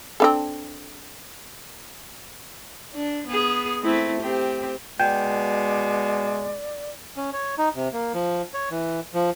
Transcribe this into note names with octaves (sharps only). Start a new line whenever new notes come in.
C4 D4 A4
D4
B3 G#4
A3 C4 E4
C4 G4
B2 G#3 D5 G5
C#4
C#5
D#4
C3
A#3
F3
C#5
E3
F3